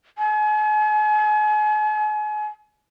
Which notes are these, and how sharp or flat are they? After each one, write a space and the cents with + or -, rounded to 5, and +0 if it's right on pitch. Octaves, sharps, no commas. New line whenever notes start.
G#5 +40